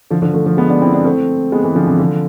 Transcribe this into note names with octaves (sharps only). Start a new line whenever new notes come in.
D3 F3
D3 F3
F3 A3
D3 F3
G#3 B3
B3 D4
C4 E4
B3 D4
A3 C4
G#3 B3
E3 G#3
D3 F3
C3 E3
D3 F3